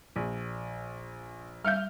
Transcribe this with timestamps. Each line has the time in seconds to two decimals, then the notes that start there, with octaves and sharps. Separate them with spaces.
0.16 A#1
1.65 G3 E5 F5 F6 G6